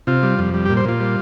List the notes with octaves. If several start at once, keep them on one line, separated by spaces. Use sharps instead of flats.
C3 F4
G3
F2
G3
G4
A#2
C5
A#2 F4
G3